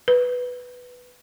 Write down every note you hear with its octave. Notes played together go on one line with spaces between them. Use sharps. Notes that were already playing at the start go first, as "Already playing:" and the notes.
B4